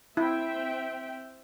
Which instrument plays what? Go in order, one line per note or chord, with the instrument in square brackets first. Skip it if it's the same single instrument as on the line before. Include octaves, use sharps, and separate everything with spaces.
[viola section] C4 E5 G5 [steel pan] E4